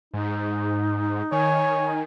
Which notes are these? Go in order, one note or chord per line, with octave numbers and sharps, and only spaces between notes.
G#2 D#4
D#3 C#5 G#5